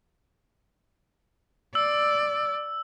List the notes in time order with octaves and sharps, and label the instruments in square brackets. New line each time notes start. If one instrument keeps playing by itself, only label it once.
[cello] D5 [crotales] E6